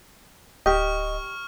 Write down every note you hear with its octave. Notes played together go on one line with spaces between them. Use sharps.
D1 G4 D#5 C#6 F6